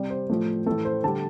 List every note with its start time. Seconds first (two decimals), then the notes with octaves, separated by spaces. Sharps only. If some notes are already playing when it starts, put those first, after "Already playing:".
Already playing: C3 G3 D5
0.10 C5
0.30 A2 F3 A3
0.66 A2 E3 A3 A4
0.85 C5
1.04 D3 G3 A5